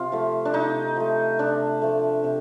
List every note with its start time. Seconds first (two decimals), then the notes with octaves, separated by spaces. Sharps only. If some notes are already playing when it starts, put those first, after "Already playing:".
Already playing: C3 F4
0.12 F3 A3
0.45 D4
0.54 C3 D#4
0.97 F3 A3
1.39 C3 D4
1.82 F3 A3
2.24 C3